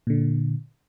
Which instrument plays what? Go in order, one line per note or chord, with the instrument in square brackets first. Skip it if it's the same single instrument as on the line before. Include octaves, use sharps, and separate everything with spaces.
[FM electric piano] A#2 D3